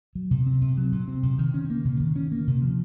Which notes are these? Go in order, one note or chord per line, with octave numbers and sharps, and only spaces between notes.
F#3
C3
C4
C3
F#3
C3
C4
C3
D#3
C#4
A#3
C3
D#3
C#4
A#3
C3
F3